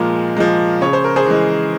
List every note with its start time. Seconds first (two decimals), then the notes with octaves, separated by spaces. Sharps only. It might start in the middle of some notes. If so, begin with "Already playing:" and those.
Already playing: A#2 F3 G#3 A#4
0.37 F3 G#3
0.81 C#3 C#5
0.93 C5
1.04 A#4
1.16 G#4 C5
1.26 E3 G#3